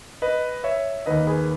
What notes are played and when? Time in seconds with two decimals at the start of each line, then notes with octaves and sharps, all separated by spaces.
0.22 B4 D#5
0.64 C#5 E5
1.06 D#2 D#3 B4 D#5
1.27 G#4 B4